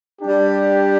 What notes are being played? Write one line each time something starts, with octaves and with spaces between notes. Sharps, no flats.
G3 D4 G4